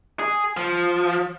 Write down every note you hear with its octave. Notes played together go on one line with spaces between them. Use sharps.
G#4
F3